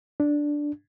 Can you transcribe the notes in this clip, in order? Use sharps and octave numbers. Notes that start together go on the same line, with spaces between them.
D4